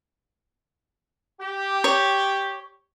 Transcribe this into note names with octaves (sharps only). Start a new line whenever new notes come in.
G4
C#5